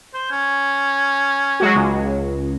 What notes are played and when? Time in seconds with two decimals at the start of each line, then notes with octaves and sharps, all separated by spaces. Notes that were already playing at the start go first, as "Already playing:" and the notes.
0.14 C5
0.31 C#4
1.60 F#3 G#3 F#4
1.75 C#2